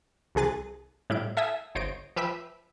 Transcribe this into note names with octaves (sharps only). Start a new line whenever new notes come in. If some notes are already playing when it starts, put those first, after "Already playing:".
C2 C3 G#4 F#6 A6
A2 G3 E4 D7
A4 E5 G#5 D#6 E6
G1 C5 C#5 D#5 D7
F3 B4 E5 G5 B6